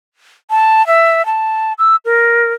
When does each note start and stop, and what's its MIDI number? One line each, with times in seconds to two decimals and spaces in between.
0.50 0.85 81
0.87 1.25 76
1.26 1.73 81
1.79 1.96 88
2.05 2.53 70